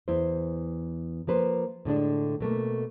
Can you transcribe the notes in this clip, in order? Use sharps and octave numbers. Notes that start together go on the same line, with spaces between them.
E2 E4 C5
F3 A#3 B4 C5
A2 D3 G#3 D4
B2 A3 A#3